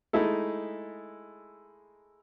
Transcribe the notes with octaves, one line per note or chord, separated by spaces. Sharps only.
G#3 A3 D#4 E4 A4